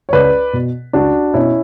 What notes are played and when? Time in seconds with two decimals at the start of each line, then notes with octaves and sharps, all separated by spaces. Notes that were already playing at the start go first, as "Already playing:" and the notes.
0.09 C#5
0.13 C#2 B4 D5
0.53 B2
0.93 C#2 D4 F#4
1.34 B2 C#4 E4